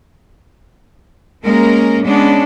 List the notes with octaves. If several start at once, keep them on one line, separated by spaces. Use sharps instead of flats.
G#3 A#3 C#4 A#4
G#3 B3 C#4 D4